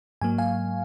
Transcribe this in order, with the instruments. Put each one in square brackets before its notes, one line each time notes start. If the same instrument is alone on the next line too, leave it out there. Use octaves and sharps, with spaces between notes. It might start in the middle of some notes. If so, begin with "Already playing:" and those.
[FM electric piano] G#2 F#3 A#3 G#5
F5 G#5